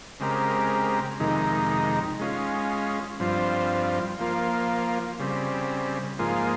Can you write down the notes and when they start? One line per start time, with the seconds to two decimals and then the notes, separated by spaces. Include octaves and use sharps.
0.20 C#3 G#3 C4 G4 A#4
1.20 F2 C3 D#3 G#3 D#4
2.19 G#3 C#4 F4
3.20 G2 F3 C4 F4
4.19 F3 A#3 F4
5.19 C#3 G3 C4
6.19 G#2 F3 A#3 F4 G#4